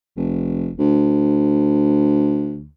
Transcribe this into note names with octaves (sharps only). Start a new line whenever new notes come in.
F1
D2